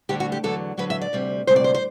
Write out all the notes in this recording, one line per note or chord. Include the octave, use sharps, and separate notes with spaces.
D2 D3 G3 G4
F#4
G4
E2 D3 F#3 A4
E2 D3 F#3 B4
E5
D5
D2 C3 G3
D2 C3 G3 C5
D5
C5
C5